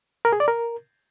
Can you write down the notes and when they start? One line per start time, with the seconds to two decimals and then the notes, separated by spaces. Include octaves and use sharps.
0.25 A#4
0.33 G#4
0.40 D5
0.48 A#4